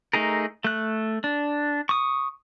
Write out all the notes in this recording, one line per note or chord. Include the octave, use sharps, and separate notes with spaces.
A3 D#4 G#4 A#4
A3 F#6
D4
C#6 D#6